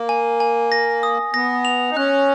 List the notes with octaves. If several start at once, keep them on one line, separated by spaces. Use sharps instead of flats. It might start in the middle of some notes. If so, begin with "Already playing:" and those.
Already playing: A#3
G#5
G#5
A#6
D#6
B3 A#6
F7
D#4
C#4 F#6